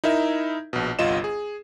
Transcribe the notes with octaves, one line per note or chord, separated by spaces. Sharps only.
D#4 E4 A#4 E5
A#1 B2
G1 C2 F4 D#5 E7
G#4